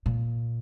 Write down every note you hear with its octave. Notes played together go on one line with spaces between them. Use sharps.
A#2